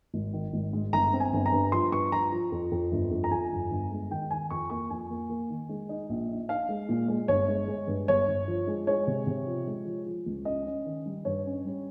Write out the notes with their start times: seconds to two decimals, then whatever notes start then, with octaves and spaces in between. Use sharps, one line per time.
0.14 G#1
0.33 D#3
0.53 G#1
0.73 G#2
0.93 G1 A#5
1.13 C4
1.20 G#5
1.33 G1
1.46 A#5
1.52 G2
1.72 F3 C6
1.92 G2 C#6
2.12 F3 A#5
2.32 F3
2.52 F2
2.72 F2
2.92 G1
3.11 F2
3.24 A#5
3.31 F2 G#5
3.51 G1
3.71 G1
3.91 G#3
4.11 D#3 G5
4.30 D#3 G#5
4.50 F2 C#6
4.70 A#3 C#6
4.90 F2 G#5
5.10 A#3
5.30 A#3
5.50 D#3
5.69 G#3
5.89 D#4
6.10 A#1
6.29 D#4
6.49 D#4 F5
6.69 G#3
6.89 A#2
7.08 G#3
7.28 G1 C#5
7.48 G#3
7.68 G#3
7.88 G2
8.08 G1 C#5
8.28 G1
8.48 F3
8.67 G#3
8.87 G#3 C#5
9.07 C3
9.27 C3
9.47 F3
9.67 G#3
9.86 F3
10.06 F3
10.26 C#2
10.45 C#4 D#5
10.66 C#4
10.86 D#3
11.06 G3
11.25 G2 C#5
11.45 C#4
11.65 G3